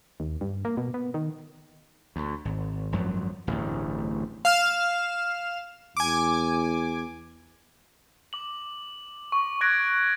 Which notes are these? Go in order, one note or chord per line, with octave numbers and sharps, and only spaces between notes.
D#2
G2
A#3
B2
B3
D#3
D2
G#1
G#1 F#2 F3 F#3
D1 A1 G2
F5 F6 E7
E2 G#5 D6
D6 F#7
C#6
C#6 F#6 G#6 A#6 D7